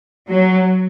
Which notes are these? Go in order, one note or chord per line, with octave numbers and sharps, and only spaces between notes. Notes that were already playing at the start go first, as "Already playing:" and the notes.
F#3